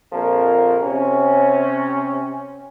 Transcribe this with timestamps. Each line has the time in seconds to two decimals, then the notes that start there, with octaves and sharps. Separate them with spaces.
0.13 A#1 F2 F3 A#3 A#4
0.82 C3 C#4